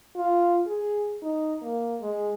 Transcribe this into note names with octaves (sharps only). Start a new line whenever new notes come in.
F4
G#4
D#4
A#3
G#3